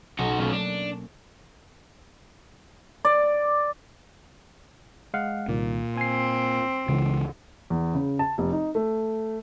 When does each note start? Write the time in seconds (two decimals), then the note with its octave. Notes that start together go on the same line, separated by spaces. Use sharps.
0.19 B1 C#4 D#4 D#5 F#5
0.39 B2 A3 A#3 C#4 F4
0.52 D4
3.05 D5
5.14 G#3 F5 F#5
5.48 C2 A#2 D#3
5.97 C4 G#5 C7
6.88 C#2 C#3 E3
7.70 E2
7.94 C#3
8.19 A5
8.38 F1
8.52 D#4
8.75 A3